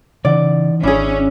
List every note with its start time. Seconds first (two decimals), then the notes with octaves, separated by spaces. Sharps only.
0.25 C#3 E3 D#4 D5 F#5
0.83 G#1 C#4 D4 E4 G#4